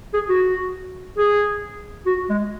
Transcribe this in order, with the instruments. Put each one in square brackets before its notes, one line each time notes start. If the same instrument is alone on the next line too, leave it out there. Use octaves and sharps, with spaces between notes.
[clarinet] G#4
F#4
G#4
F#4
G#3